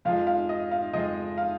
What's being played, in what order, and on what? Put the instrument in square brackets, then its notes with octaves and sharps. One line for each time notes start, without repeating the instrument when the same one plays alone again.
[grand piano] F2 F3 G#3 [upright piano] F5
[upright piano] F5
D#5
F5
[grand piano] F2 F3 G#3 [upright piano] D#5
[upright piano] F5